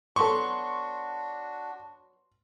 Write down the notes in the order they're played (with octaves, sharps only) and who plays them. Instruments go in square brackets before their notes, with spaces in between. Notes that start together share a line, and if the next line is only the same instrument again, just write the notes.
[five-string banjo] F#3 B3 A4 [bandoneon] D4 F#4 [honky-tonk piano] C6 [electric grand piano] C#6